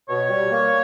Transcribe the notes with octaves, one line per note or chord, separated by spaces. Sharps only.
B2 C#5
G3
A#3